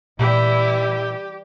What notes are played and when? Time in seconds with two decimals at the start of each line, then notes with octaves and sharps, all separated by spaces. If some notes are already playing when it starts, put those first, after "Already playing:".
0.19 A#2 E3 G3 A3 A#3 E4 G4